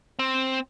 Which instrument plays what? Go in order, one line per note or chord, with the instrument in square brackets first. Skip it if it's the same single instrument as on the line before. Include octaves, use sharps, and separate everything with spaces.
[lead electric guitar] C4